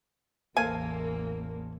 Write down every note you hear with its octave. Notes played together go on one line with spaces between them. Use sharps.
A1 E2 A#3 A4 C5 F5 G#5